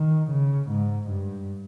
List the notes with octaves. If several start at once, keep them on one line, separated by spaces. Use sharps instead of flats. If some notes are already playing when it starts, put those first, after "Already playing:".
Already playing: D#3
C#3
G#2
G2